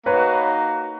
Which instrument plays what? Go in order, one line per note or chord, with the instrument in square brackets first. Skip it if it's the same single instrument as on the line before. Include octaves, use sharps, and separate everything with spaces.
[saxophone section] A#3 D#4 F#4 [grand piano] B4 C#5